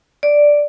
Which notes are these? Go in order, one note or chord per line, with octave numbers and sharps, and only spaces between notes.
D5